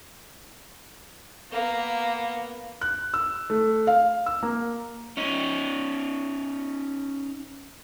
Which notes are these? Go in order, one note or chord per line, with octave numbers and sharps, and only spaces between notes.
A#3 B3
F#6
E6
A3
F5
E6
A#3
C#4 D#4